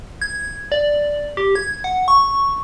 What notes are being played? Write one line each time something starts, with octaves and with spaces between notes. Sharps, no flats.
G#6
D5
G4
G#6
F#5
C#6